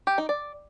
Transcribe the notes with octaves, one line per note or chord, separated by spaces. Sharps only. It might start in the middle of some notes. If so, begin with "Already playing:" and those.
G4
D#4
D5